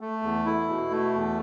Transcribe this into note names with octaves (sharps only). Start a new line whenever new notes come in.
A3
E2
E4
B2
A3
E2